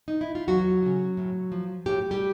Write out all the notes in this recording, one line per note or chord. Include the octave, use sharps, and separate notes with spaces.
D#4
E4
F4
E2 F#3 F#4
E3
C#3
A2
F3
A2 G4
G3 G4